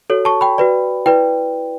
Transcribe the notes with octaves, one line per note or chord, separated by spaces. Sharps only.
F#4 A4 C#5
A5 C#6
G5 B5
F#4 B4 D5
E4 B4 D5 G5